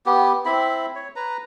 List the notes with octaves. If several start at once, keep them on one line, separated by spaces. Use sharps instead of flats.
B3 G4
C4 E4 B5
C#5
B4 A#5